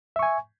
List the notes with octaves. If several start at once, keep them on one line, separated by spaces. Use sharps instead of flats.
E5 G#5 C#6